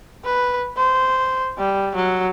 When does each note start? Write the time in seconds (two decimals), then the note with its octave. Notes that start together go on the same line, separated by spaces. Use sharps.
0.25 B4
0.77 C5
1.59 G3
1.96 F#3